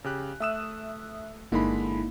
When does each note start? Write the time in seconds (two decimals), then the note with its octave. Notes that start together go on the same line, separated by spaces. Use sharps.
0.04 C#3 G4 F#6
0.40 A3 E5 D#6 E6 F#6 E7
1.52 G1 D3 G#3 A#3 D#4 E4 B5